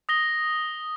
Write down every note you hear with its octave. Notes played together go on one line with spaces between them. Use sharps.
D#6 A#6 G7